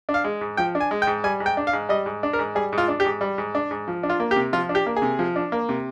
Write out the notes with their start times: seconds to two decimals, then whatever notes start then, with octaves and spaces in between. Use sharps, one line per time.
0.09 D4
0.14 F5
0.24 G#3
0.41 G#2
0.57 F3 G5
0.75 D4
0.80 G#5
0.91 G#3
1.02 G5
1.07 G#2
1.24 G3 G#5
1.40 G#2
1.46 G5
1.57 D4
1.67 F5
1.73 G#2
1.89 G3 D#5
2.06 G#2
2.23 D4
2.33 A#4
2.39 G#2
2.55 G3 G#4
2.73 G#2
2.78 F4
2.88 D4
3.00 G4
3.04 G#2
3.21 G3
3.38 G#2
3.55 D4
3.71 G#2
3.88 F3
4.03 D4
4.10 F4
4.20 A#3
4.31 G4
4.36 C3
4.53 F3 F4
4.69 D4
4.75 G4
4.86 A#3
4.97 G#4
5.02 C3
5.19 F3
5.36 D4
5.52 A#3
5.69 C3